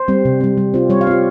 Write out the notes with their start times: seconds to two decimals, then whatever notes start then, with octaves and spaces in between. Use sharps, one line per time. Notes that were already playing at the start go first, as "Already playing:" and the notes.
Already playing: C5
0.08 G3 C4
0.25 C3
0.40 G3 C4
0.57 G3
0.74 C4 F4
0.90 G3 C#5
1.01 F5
1.07 C4 F4 G4